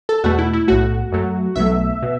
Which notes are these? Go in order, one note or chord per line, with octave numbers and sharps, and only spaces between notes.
A4
E2 B2 A3 F#4
E4
E4
B1 A2 A3 F#4
F#2 F#3 A3
B1 B2 F#3 A3 E5
B2